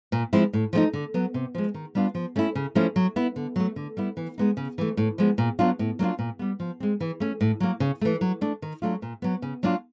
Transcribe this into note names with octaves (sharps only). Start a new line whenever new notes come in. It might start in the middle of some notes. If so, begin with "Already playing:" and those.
A#2
F3 G#3 C4 E4
A2
F3 A3 C4 D#4
D3
F#3 B3
C3
F3 G#3
D#3
G3 B3 D4 F4
F3
A3 C#4 E4
C#3
F3 A3 C#4 E4
F#3
B3 E4
D3
F#3 A3
D3
G3 B3 E4
E3
G#3 B3 D#4
C#3
E3 A3
A2
F3 G#3 B3
A#2
F#3 B3 D4 F4
A2
F#3 A#3 D4 F4
A#2
G3 B3
F3
G#3 C4
E3
A3 C#4
A2
F#3 A#3
C#3
E3 A3
F#3
A3 D4
D#3
F#3 A3 D4 F4
A#2
F#3 B3
C#3
F#3 A#3 D4 F4